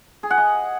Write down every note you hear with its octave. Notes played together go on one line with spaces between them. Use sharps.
G#4
F#5
D#5